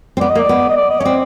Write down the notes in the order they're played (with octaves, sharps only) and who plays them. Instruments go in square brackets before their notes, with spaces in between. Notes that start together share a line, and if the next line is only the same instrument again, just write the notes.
[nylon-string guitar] C4
[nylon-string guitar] B3 [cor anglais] D5
[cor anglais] D#5
[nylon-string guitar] A#3
[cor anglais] D5
[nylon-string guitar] B3
[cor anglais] D#5
D5
D#5
[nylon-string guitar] C#4 [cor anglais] C#5
[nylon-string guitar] C4 [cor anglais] D5